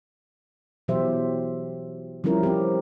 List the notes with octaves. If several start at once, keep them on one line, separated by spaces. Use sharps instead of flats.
B2 E3 F#3 G4 C5 E5
F3 G3 C#4 E4 A#4
C4 G4